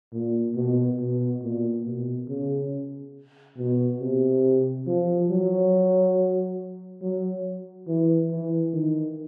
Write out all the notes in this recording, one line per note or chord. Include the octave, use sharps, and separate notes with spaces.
A#2
B2
B2
A#2
B2
C#3
B2
C3
F3
F#3
F#3
E3
E3
D#3